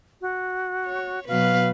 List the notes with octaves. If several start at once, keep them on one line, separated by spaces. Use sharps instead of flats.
F#4
C#5
B2 F#3 B4 F5